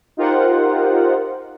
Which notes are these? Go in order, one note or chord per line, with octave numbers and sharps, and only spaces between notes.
D#4 F4 G4 A#4 C5 F#5